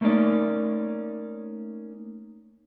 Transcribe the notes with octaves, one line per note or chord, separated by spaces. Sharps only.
A3 A#3 C#4 D#4 D5